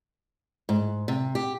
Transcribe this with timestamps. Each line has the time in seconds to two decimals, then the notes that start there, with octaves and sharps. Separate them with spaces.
0.69 G#2
1.08 C3
1.35 G4